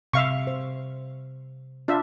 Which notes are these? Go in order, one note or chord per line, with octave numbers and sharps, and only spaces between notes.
C3 E5 F5 C#6
C5
D4 F4 E5